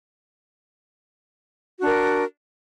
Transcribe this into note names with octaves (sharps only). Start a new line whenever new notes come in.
D4 F#4 A#4